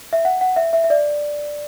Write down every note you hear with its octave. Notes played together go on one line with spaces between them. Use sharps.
E5
F#5
F#5
E5
E5
E5
D5